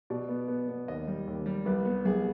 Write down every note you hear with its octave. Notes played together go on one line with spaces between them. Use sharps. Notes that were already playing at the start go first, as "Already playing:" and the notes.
B2 D5
B3
B3
B3
D#2 D#5
G3
D#2
G3
C2 B4
B3
C2 G#4